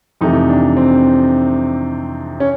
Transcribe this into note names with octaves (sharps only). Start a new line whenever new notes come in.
F2 C3 E3 A3 D#4
D4
C4
C#4